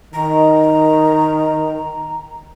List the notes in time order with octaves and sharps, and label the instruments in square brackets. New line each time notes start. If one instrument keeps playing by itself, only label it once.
[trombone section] D#3 [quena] A#5